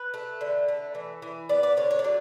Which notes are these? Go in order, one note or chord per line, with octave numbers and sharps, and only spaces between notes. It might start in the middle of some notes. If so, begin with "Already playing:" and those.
Already playing: B4
A3
D3
A3
E3
E3
B3 D5
D5
D3 C#5
C#5
D5
F#3